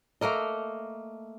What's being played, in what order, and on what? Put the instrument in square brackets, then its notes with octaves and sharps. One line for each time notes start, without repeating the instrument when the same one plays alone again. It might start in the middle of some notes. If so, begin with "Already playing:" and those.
[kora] A3 A#3 A#4 D#5